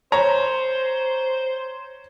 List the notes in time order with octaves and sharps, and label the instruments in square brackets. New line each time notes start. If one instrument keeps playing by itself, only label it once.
[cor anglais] C5 [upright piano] C#5 A#5